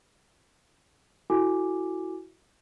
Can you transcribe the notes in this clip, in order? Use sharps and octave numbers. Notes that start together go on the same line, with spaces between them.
E4 F#4 A4 G#5 D6